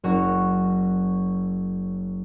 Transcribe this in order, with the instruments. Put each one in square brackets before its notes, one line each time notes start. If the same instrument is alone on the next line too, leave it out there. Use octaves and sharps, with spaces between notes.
[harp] F#1 C#4 F#4 C#5